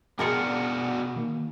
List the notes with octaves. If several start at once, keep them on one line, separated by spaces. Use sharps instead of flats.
B2 D4 F4 F#4 G#4 A#4 G5 C#7
D#3 A#3